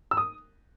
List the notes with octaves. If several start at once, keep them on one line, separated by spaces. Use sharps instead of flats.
E6
D#6